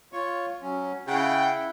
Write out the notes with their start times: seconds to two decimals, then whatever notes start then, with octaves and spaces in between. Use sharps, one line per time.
0.13 F4 C#5 C#6
0.62 F#3 C#4
1.08 C#3 E4 F#5 G5